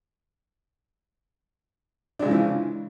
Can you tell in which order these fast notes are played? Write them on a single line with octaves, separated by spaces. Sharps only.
D4 G#3 C#3 F3 E3